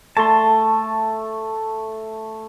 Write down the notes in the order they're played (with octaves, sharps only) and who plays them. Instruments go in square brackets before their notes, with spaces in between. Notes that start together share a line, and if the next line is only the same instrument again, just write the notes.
[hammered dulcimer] A3 [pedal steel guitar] A5 C6